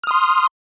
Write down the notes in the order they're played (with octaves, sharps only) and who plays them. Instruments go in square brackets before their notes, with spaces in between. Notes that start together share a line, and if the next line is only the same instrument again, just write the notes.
[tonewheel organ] F6
D#6
C6